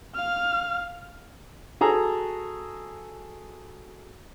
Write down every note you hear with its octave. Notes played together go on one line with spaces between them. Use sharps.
F5 F6
F#4 G#4 A4 A#5